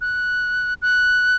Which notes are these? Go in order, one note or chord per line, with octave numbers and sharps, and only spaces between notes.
F#6
F#6